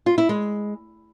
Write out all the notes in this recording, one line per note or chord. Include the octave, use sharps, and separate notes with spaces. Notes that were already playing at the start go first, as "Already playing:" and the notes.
F4
E4
G#3